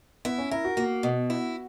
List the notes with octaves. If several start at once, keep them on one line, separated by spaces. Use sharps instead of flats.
B3 E4
C#4
E4 A#4
F#4
A#3 F#4
B2
E4